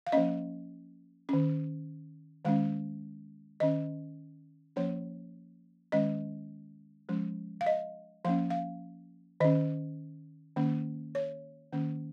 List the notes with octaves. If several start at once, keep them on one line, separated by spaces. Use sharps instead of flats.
F5
F3 A#3 C#4 D#5
D#3 C#4
D#3 G#3 C#4 F5
D#3 C#4 D#5
F3 A#3 C#4 C#5
D#3 G#3 C#4 D#5
F3 G#3 C#4
F5
D#5
F3 A#3 C#4 F5
F5
D#3 C#4 D#5
D#3 A#3 C#4
C#5
D#3 A#3 C#4